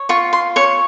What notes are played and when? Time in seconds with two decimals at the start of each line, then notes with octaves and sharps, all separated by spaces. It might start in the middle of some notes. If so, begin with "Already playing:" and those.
Already playing: C#5
0.09 F4 C#6
0.33 C6
0.56 C#5 C#6